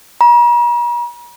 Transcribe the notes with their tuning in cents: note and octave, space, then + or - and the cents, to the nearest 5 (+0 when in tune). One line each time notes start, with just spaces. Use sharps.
A#5 +45